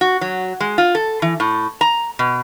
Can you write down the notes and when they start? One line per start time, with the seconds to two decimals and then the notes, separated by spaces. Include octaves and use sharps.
0.01 F#4
0.21 F#3
0.60 G#3
0.78 F4
0.95 A4
1.22 E3
1.40 A2
1.81 A#5
2.19 B2